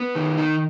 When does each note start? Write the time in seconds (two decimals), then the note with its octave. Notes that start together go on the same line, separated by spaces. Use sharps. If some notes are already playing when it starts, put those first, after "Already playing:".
Already playing: B3
0.15 D#3
0.38 D#4